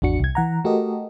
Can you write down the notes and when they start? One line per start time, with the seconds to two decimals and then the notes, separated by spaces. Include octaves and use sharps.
0.02 G#1 E2 D4 F#4 C#7
0.20 C2 G#6
0.35 E3 F#5 A#5
0.64 A3 F#4 G4 A4 A#4 D#5